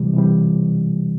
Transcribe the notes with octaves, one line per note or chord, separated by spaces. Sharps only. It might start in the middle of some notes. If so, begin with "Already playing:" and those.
Already playing: C3 E3 G3
C3 E3 G3